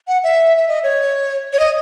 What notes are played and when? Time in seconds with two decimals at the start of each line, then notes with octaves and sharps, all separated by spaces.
0.08 F#5
0.24 E5
0.57 E5
0.69 D#5
0.83 C#5
1.53 C#5
1.60 D#5